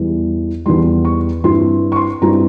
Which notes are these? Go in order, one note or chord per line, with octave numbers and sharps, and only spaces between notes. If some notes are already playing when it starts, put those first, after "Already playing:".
Already playing: E2 E3 G3
E2 E3 G3 C6
C#6
G2 G3 C4 E4 C6
C#6
C6
G2 G3 C4 E4 A#5